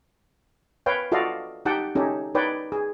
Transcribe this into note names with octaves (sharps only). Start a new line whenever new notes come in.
B4 C#5 F5 G5
F4 F#4 A4 D5 D#5 F5
D#4 G4 F#5 G5 A5
C#4 D#4 G4 A4
D#4 B4 C#5 D5 G5
G#4